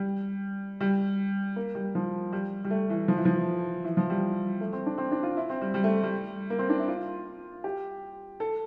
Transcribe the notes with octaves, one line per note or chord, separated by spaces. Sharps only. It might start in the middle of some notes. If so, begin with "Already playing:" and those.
Already playing: G3
G3
A#3
G3
F3
G3
G3
A3
E3
F3
E3
F3
E3
F3
G3
A3
C4
D4
C4
D4
F4
E4
C4
G3
G3
A3
G3
A#3
C4
D4
E4
F4
G4
A4